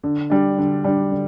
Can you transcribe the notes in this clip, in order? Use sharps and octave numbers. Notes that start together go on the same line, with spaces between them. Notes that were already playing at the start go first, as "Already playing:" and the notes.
D3
G3 D4
D3
G3 D4
D3